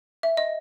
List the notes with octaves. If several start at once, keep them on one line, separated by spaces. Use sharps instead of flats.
E5
D#5